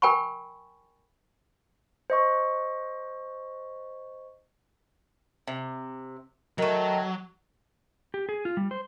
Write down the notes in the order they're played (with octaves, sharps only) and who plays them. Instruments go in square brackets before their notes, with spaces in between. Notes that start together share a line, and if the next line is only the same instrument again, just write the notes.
[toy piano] A#4 G5 G#5 B5 C#6
[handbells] C5 D#5 C#6
[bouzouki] C3
[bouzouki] D#3 A3 [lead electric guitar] F#3
[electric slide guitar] G4
G#4
F4
G3
C5